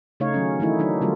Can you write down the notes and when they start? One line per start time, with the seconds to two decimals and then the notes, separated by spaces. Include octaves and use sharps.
0.20 C#3 A3 D#4 C#5 F5
0.34 D#3 F#3 C#4
0.60 D#3 E3 A3 D#4 E4
0.79 D#3 F#3 D4 D#4
1.01 D3 F#3 G3 A3 F4